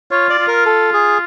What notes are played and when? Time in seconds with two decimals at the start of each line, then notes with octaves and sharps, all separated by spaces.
0.11 F4 C#5
0.30 D5
0.38 F4
0.47 A#4
0.66 A4
0.93 G#4